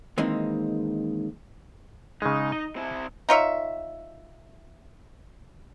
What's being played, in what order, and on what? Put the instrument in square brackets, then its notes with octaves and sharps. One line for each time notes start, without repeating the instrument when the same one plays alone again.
[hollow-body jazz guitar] D#3 E3 G#3 A#3 C4 D#4
[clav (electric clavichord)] C#3 G#3 [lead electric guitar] D#4
[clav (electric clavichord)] D#5
[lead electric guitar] C4 E4
[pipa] D#4 F4 C#5 E5